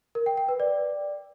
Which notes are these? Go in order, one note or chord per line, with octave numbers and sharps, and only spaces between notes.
A#4
G5
G5
B4
D5